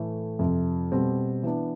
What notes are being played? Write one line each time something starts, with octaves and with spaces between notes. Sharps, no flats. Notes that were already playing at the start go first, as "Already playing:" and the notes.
Already playing: A2 E3 A3
F2 C3 F3
B2 G3 C4 G4
E3 B3 D4